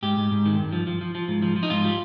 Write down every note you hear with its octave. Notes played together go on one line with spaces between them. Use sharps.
G#2 G4
G#2
G#2
D#3
G2
F3
F3
F3
F3
G#2
F3
F3
D#4
G#2 F4
G3